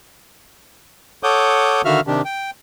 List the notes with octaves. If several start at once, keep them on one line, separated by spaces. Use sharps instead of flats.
A4 C#5 F#5 D6 D#6 G6
D3 D#3 F#4 E5 F5 F6
C3 D#3 D4 G4
G5